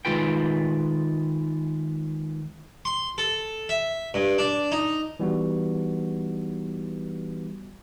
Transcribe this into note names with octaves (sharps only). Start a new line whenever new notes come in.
D#3 G#3 F4 B4 G5
C6
A4
E5
G2
D4
D#4
E3 G3 B3 D#4 F#4